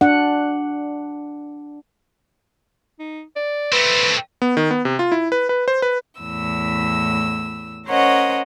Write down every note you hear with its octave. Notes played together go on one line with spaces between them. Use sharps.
D4 F#5
D#4
D5
A3 C4 B4
B3
D#3
B3
C3
F4
E4
B4
B4
C5
B4
E2 A2 E6
C#4 A#4 C5 C#5 D#5 F#5